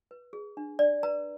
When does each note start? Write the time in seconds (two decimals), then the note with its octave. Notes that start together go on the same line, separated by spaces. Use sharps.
0.11 B4
0.33 G#4
0.57 D4
0.79 D4 D5
1.03 B4 A#5